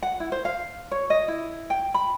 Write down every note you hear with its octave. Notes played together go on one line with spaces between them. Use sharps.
F#5
E4
C5
F5
C#5
D#5
E4
G5
B5